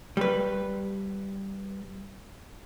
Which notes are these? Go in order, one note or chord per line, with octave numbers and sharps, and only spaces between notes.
G3 B4